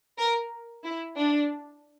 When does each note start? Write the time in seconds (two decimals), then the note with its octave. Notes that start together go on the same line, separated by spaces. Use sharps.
0.18 A#4
0.84 E4
1.17 D4